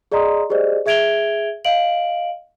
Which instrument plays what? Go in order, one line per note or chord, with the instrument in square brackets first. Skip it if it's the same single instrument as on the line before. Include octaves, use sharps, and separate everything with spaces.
[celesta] G#4 D5 D#5 A#5 C6 D#6
G4 G#4 C5 D5 D#5
G#4 E5 G#6 D7 F7 G7
D#5 F5 D7 F#7